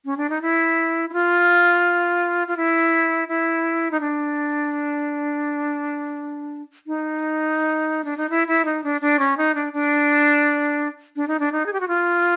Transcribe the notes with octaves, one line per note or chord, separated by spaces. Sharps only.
C#4
D4
D#4
E4
E4
F4
F4
E4
E4
D#4
D4
D#4
D4
D#4
E4
E4
D#4
D4
D4
C#4
D#4
D4
D4
D4
D#4
D4
D#4
G#4
G4
F#4
F4